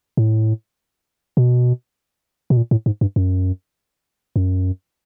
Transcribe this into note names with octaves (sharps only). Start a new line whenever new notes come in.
A2
B2
B2
A#2
A2
G#2
G2
F#2
F#2